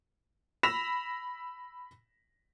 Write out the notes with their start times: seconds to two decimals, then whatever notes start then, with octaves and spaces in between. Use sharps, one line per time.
0.63 B5 E6 A#6 B6 E7 F7